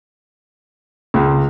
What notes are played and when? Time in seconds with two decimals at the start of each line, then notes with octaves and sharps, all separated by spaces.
1.14 C#2